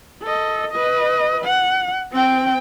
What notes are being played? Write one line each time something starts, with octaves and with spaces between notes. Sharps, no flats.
A4 D#5
B4 D#5
F#5
C4 G5